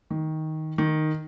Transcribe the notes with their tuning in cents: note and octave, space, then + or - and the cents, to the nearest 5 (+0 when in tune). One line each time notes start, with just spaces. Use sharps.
D#3 +10
D#3 -5